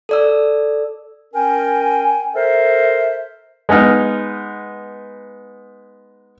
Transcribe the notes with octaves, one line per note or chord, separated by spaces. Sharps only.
A4 D5 E6
C#4 A#4 G5 G#5
A4 A#4 C5 E5
G#3 B3 D#4 F6